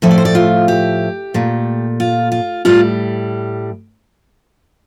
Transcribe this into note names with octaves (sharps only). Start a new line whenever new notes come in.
A2 F3 A3 E5
D5
C5
D5
F4
G4
A#2 A3
F4
F4
A2 G3 F4